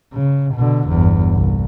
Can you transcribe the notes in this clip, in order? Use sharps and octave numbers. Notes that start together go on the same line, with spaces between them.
C#3
B2 D3
G1 E2
C2